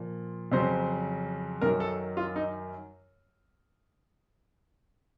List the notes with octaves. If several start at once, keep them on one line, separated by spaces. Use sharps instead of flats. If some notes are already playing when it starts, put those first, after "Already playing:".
Already playing: A#2 F3
F2 C#3 F#3 C5
F#2 D#3 F#3 A#4
A4
F4
D#4